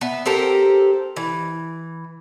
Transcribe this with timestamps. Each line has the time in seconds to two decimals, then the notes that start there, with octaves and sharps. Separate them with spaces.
0.01 B3 E5
0.26 C4 G4 A4 A#4
1.16 E3